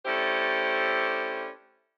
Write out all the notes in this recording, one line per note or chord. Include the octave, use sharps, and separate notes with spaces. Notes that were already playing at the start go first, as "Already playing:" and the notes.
A3 C#4 D4 E4 G4 C5